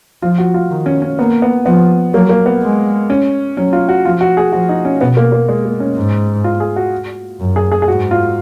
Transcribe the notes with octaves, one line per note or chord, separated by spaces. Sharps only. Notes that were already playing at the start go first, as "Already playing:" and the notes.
F3 F4
F#4
F4
D#3
C#4
C#4
A#3 B3
B3
F3 B3
F#3 A#3
A#3
B3
G#3
C#4
F#3 C#4
F4
F#4
F3 F4
F#4
G#4
F3 F#4
D#4
C#4
B2 B3
A#3
A#3
G#3
A#3
C#4
G#2
F4
G#4
F#4
F#2
G#4
G#4
G#4
G#2 F#4
F4